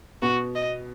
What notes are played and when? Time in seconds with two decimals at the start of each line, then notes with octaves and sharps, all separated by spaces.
0.22 B2 B3 F#4
0.55 D#5